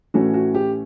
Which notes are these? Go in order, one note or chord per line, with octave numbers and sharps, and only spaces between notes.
A2 E3 A3 C#4 F#4
F#4
G4